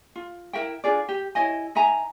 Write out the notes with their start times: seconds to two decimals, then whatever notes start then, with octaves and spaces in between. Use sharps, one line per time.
0.16 F4
0.53 E4 A#4 E5 G5
0.84 D4 F4 G#4 D5
1.09 G4
1.35 E4 C#5 D#5 G#5
1.75 D#4 E5 G#5 A#5